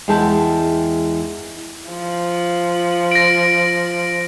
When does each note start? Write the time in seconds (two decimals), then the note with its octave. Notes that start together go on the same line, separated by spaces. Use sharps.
0.08 E2 G#3 E4 G5 A5
1.90 F3
3.12 A#6 D7